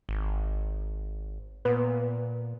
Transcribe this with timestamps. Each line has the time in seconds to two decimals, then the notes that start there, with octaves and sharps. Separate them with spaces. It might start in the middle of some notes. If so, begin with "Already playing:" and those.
0.09 G#1
1.65 A#2 B3